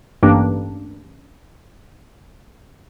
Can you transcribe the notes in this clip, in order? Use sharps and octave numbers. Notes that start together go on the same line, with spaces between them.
A1 G2 A#3 D4